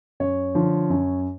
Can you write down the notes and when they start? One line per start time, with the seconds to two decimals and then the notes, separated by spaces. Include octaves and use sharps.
0.20 F#2 C#5
0.55 D3 F3
0.90 F#2